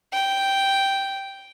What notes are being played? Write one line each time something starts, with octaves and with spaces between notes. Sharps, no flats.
G5